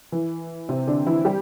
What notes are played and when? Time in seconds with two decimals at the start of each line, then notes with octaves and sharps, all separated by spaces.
0.12 E3
0.69 C3 C4
0.87 D3 D4
1.06 E3 E4
1.25 G3 G4